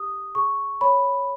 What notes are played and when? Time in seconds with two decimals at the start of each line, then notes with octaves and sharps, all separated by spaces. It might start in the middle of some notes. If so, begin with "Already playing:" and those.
Already playing: G4 D#6
0.35 G#4 C#6
0.81 C#5 B5